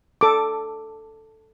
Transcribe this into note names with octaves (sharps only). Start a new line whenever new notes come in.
A4 D6